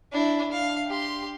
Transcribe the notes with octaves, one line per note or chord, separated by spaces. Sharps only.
D4 E4
F5
G4 C6